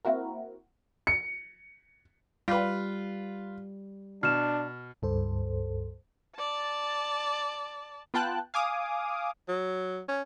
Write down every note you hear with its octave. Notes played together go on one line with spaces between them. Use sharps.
A#3 C4 E4 F#4 A#4
C#7
G3 F4 B4
B2 D4 F6 E7
C#2 G2 A4 C5
D5 A5
B3 F4 G5 A5 F#6
F5 G#5 D6 D#6
F#3
C#4